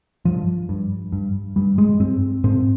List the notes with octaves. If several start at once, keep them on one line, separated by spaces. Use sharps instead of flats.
G2 F3
G2
G2
G2 G3
G#3
G2 C4
G#2 C4